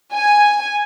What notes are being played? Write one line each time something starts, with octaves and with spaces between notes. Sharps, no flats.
G#5